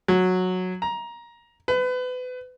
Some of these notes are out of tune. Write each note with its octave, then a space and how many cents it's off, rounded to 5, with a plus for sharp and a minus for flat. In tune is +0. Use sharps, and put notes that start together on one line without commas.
F#3 -10
A#5 +15
B4 +30